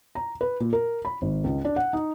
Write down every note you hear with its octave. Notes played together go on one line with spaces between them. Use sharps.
A#5
B4
A#2
A#4
B5
G#1
C#2
D4
F#5
D#4